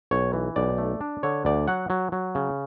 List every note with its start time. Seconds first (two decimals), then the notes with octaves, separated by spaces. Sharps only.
0.11 B1 C#5
0.33 E3
0.56 B1 D5
0.78 A3
1.01 D4
1.23 D3 C#5
1.45 D2 D5
1.68 F#3 F#5
1.90 F#3
2.12 F#3
2.35 C#3